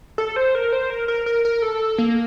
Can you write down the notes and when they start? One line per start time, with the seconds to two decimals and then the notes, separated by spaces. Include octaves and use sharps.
0.18 A4
0.36 C5
0.55 A#4
0.72 C5
0.90 A#4
1.08 A#4
1.26 A#4
1.45 A#4
1.62 A4
1.98 A#3